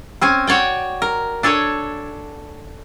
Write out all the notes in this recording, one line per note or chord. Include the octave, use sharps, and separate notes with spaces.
C4 C#4 G#5
F#4 C#5 D5 G5
A#4
D4 A4 C#5 G#5